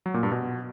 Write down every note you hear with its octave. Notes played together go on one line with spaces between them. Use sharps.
F#3
A#2
G2
B2